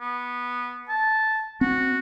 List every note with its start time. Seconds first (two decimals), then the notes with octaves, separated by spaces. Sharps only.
0.01 B3
0.89 A5
1.61 C4 F#4